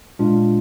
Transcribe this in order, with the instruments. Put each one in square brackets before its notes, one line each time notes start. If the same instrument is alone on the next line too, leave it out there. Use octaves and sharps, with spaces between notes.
[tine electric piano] A#2 G#3 D4 F4